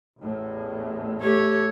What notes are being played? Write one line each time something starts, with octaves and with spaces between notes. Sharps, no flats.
A1 E2 A2
A3 G4 C#5